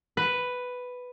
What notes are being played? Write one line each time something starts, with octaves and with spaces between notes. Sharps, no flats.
B4